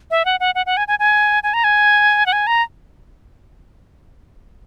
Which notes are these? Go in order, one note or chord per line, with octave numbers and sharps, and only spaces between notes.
E5
F#5
F#5
F#5
F#5
G#5
G#5
G#5
G#5
A#5
G#5
F#5
G#5
A#5